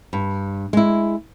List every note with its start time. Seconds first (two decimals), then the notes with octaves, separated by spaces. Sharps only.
0.13 G2
0.73 G#3 E4